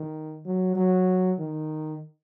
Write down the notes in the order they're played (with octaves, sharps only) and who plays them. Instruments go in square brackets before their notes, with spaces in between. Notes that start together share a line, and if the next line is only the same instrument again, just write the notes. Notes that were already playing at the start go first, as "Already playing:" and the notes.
Already playing: [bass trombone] D#3
F#3
F#3
D#3